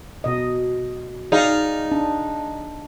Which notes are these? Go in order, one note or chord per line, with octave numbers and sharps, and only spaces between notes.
B2 D#5
D#4 G#4 D5 F5
D4